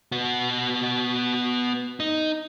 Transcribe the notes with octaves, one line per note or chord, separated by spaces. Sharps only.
B3 F#4
D#4